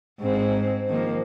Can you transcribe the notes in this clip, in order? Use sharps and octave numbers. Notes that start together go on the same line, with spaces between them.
G#2 C4
D#3 F3 A#3